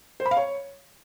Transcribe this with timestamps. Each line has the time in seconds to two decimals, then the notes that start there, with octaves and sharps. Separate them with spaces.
0.20 C5
0.26 B5
0.31 F5
0.37 C#5